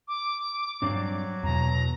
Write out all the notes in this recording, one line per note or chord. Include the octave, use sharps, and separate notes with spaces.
D6
G2 F#3 C4 D4
E2 B2 A#5